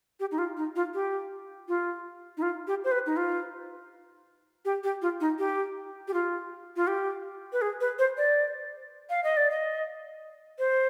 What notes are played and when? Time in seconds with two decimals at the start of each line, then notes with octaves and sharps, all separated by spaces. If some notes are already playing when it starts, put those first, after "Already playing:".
0.20 G4
0.31 D#4
0.38 F4
0.57 D#4
0.76 F4
0.94 G4
1.68 F4
2.37 D#4
2.42 F4
2.67 G4
2.84 C5
2.91 B4
3.06 D#4
3.17 F4
4.65 G4
4.83 G4
5.02 F4
5.20 D#4
5.39 G4
6.08 G4
6.13 F4
6.76 F4
6.87 G4
7.53 B4
7.61 G#4
7.80 B4
7.99 C5
8.17 D5
9.10 F5
9.24 D#5
9.37 D5
9.50 D#5
10.58 C5